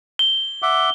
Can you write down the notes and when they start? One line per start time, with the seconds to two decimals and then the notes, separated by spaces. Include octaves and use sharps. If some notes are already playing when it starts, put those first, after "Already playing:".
0.19 G7
0.62 E5 F#5 D6